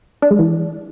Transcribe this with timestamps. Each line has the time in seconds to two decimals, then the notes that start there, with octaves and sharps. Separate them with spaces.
0.22 D4
0.31 G#3
0.39 E3